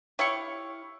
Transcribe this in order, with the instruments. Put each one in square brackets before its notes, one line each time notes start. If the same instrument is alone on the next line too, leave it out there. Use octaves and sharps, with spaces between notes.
[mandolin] E4 F5 C#6 [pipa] F4 G4 C#5